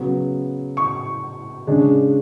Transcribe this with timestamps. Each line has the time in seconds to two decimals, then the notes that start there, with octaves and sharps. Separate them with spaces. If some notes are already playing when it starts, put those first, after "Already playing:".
Already playing: C#3 F#3 B3
0.77 C#6
1.67 C#3 G#3 D4